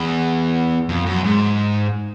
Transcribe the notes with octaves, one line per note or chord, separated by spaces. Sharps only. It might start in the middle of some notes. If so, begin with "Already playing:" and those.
Already playing: E2
F2
F#2
G#2